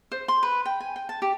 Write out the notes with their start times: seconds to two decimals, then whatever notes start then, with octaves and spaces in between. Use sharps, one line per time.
0.12 C5
0.28 C6
0.43 B4
0.66 G5
0.80 G#5
0.96 G5
1.09 A5
1.22 G4